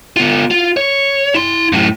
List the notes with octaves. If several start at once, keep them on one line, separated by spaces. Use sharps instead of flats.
B3 F4
F4
C#5
E4 C6
F#2 A2